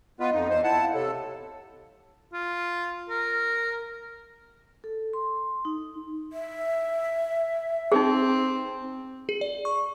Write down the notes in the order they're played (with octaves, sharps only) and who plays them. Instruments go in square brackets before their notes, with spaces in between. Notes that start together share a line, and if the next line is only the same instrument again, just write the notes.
[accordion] B3 F4 B4 [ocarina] D#5
[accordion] F2 D#4
E2 C5
E4 F#5 A5
[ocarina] F5
[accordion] C3 A4 [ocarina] C#5
[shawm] F4
A#4
[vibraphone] A4
C6
D#4
[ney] E5
[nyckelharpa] C4 [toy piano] D#4 G#4
[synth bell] G#4
D5
C#6